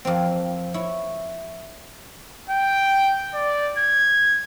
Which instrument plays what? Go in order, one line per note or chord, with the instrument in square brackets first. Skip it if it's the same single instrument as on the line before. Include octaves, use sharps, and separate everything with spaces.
[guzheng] F2 A#3 C4
E4 C#5
[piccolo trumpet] G5
D5
G#6